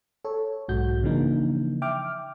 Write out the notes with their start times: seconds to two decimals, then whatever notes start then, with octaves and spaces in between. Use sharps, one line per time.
0.25 A4 C#5
0.68 B1 G#2 F#4 G6
1.03 C#3 E3 F3 A#3 D4 D#4
1.82 E5 G5 D6 F6